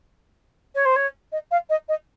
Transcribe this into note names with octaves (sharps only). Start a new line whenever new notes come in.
C#5
C5
C#5
D#5
F5
D#5
D#5